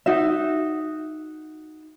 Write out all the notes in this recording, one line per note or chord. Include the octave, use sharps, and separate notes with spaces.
D#4 F#4 E5